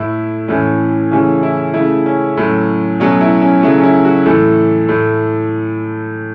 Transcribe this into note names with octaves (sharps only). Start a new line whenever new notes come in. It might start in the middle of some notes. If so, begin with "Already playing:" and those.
Already playing: A2 A3 E4
A2 E3 A3 C#4
C#3 E3 A3 C#4
E4
C#3 A3 E4
C#4
A2 F#3 A3
B2 F#3 A3 C#4
E4
C#4
C#3 F#3 A3 E4
C#4
E4
F#4
A2 E3 A3 A4
A2 A3